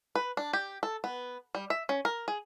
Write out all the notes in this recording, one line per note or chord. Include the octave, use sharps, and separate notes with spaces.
B4
D4
G4
A4
B3
G3
E5
C#4
A#4
G#4